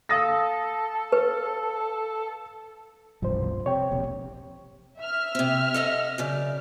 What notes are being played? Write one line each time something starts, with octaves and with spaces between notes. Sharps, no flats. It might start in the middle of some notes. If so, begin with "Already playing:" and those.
A4 F5 D#6 A#6
B4
E1 C2 G2 F3 C5
C3 C#5 G5
E1 A#1 C3
E5 F6
C3 C4
A4 D#5 F#5
F#2 C#3 D5